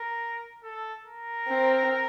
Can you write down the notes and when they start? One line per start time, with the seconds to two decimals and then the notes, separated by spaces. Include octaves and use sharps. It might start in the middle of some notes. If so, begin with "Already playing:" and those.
Already playing: A#4
0.63 A4
1.06 A#4
1.48 C4